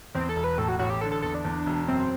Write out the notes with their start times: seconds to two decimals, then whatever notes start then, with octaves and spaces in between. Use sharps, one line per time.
0.15 E2 C4
0.29 A4
0.36 E1
0.44 B4
0.58 A2 A4
0.68 F#4
0.79 A1 F#4
0.90 G4
1.01 D3 A4
1.12 A4
1.22 E2 A4
1.34 D4
1.45 E2
1.66 E1
1.88 F#2 C4